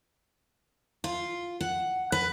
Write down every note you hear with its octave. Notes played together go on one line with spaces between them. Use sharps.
F4
F#5
B4